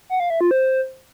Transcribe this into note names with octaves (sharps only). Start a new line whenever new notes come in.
F#5
F5
E5
F4
C5